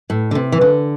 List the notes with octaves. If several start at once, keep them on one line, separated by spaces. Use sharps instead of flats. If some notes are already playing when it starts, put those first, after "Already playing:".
A2
D3
C3
E3
D3